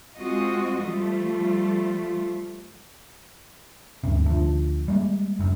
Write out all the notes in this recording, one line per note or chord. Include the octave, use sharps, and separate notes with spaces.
G#3 C4 F4 F#4 D#5
F3 G3 A3 F4
D2 G2 C3
D2 F3
G3 G#3 A#3
F#1 F#2